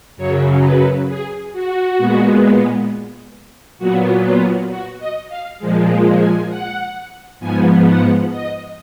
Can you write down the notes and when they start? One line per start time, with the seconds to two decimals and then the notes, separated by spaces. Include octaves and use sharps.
0.17 F#2 C#3 F#3 C#5
0.63 B4
1.08 G#4
1.53 F#4
1.98 A#2 G#3 B3
3.79 A#2 F#3 B3 F#4
4.24 F4
4.69 F#4
4.99 D#5
5.29 F5
5.59 A#2 F3 G#3
6.19 G#5
6.49 F#5
7.40 G#2 F3 B3 G#5
7.85 F#5
8.30 D#5